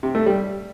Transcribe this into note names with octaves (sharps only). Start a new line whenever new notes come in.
C3
A3
G3